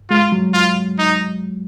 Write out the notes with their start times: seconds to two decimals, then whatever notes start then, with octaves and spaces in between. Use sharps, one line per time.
0.10 G#3 F4
0.32 F#3
0.54 F4
0.99 D#4